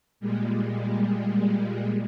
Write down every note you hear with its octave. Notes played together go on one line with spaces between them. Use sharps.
A#2 G3 G#3